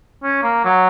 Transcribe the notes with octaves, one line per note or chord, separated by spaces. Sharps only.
C#4
A#3
F#3